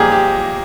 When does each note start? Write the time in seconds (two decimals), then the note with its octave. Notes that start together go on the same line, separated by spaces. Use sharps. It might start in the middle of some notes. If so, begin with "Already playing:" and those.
Already playing: A#2 F3 A#3 D#4 G4 G#4
0.12 G4